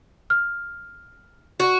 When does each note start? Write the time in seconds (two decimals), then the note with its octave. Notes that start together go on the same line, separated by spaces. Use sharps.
0.30 F6
1.60 F#4